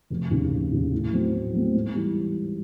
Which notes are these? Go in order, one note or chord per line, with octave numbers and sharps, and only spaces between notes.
F1
D#2 C#3
F1
D#2 C#3
A2
F#3 A3 C4
A2
F#3 A3 C4
G#2
E3 G3